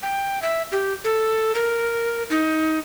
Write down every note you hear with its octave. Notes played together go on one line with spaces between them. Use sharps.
G5
E5
G4
A4
A#4
D#4